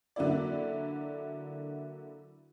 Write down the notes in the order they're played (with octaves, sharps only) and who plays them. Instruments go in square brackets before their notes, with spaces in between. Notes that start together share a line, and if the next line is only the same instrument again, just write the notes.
[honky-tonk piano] D3 F#3 A#3 E4 D5